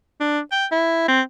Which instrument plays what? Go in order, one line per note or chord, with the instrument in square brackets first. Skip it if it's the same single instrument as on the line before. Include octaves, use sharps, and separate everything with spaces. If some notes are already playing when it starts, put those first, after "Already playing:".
[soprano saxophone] D4
G5
E4
C4